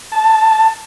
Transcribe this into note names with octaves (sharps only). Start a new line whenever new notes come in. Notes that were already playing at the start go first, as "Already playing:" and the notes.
A5